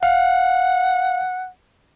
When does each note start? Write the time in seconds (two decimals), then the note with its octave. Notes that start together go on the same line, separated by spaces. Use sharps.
0.03 F5 F#5